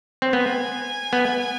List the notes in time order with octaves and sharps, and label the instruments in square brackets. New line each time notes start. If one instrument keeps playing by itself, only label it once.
[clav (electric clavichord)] C4
[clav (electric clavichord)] B3 [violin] G#5
[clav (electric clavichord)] B3